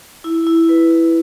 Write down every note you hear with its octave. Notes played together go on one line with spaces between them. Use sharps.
E4
E4
B4
E4